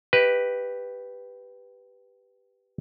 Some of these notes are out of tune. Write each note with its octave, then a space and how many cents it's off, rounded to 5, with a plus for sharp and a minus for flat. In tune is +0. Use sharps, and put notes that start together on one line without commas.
G4 +0 B4 +0 D#5 +30